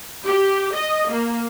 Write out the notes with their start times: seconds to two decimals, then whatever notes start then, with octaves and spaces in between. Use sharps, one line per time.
0.25 G4
0.73 D#5
1.09 A#3